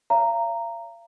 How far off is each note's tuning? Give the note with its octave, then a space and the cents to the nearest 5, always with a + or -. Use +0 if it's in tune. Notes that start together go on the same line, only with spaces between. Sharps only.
C#5 +45 F5 -40 A#5 -10